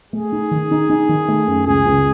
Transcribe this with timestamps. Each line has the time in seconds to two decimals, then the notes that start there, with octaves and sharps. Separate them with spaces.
0.13 A3 G#4
0.32 D#4
0.51 D#3
0.71 D#4
0.90 D#4
1.09 D#3
1.28 A3
1.47 F#2
1.67 C#2 G#4
1.85 C#2